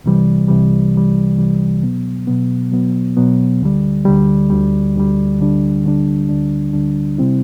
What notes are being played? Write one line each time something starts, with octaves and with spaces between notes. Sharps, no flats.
C2 C3 E3 G3
C2 C3 E3 G3
C2 C3 E3 G3
C2 C3 E3 G3
B2 F#3 B3
B2 F#3 B3
B2 F#3 B3
B2 F#3 B3
D2 D3 G3
D2 D3 G3
D2 D3 G3
D2 D3 G3
D2 D3 G3 D4
D2 D3 G3 D4
D2 D3 G3 D4
D2 D3 G3 D4
C3 G3 C4 E4